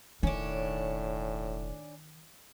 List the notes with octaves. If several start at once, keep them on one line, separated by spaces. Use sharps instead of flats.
E1 A2 D#3 C#4 D4